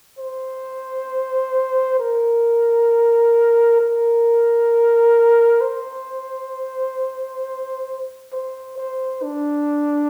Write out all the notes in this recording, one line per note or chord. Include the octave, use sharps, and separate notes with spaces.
C5
A#4
A#4
C5
C5
C5
D4